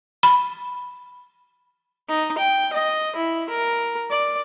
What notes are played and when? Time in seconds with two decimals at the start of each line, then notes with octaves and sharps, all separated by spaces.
0.23 B5
2.09 D#4
2.38 G5
2.73 D#5
3.16 E4
3.50 A#4
4.11 D5